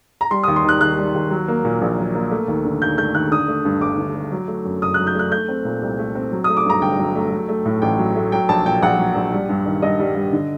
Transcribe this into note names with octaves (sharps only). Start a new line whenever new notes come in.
A#5
G3 C6
D#2 D#6
C6
D#3 F#6
D#2 F#6
G3
D#2
F#3
A#3
A#2
A#1
F#3
A#3
A3
D#2
D3
D#2 G6
A3 G6
D#2 F#6
D3 D#6
A3
G2
G1 D6
D3
A3
F#3
A3
F#2
F#1 D#6
F#3 F#6
G6
A3 F#6
A3 G6
C4
A#2
C2
A3
C4
F#3
A3 D#6
D6
G2 A#5
G1 G5
F#3
A3
F#3
A3
A2
A1 G5
F#3
A3
F#3 G5
A#1 A5
A#2 G5
A#1 F#5
F#3
A#1
G3
G2
D#3
G2 D#5
G3
G2
D3